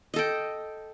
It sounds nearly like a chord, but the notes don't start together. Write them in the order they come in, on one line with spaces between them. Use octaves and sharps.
D#5 A4 G5